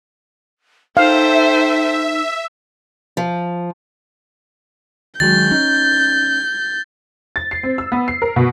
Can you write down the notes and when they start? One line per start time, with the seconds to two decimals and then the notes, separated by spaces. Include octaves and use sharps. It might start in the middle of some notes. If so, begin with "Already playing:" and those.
0.97 D#4 A4 C5 E5 F5 G5
3.17 F3
5.20 D#3 F#3 G#3 G6 A6
5.51 C#4 D#4
7.36 A6
7.51 C7
7.63 C4
7.78 E6
7.92 B3
8.08 C7
8.22 A#4
8.36 B2